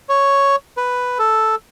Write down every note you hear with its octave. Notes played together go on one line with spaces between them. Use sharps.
C#5
B4
A4